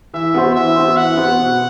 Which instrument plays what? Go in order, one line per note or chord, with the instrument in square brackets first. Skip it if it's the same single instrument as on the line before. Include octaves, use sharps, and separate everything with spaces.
[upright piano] E3 [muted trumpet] E5
[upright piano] B3 F#4 C5
[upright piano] E3 [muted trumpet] E5
[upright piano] B3 F#4 C5
[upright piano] E3 [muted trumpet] F#5
[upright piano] B3 F#4 C5
B2